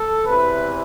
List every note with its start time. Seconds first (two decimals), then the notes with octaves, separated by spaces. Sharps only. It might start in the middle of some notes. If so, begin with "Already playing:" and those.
Already playing: A4
0.25 E2 C3 E3 B4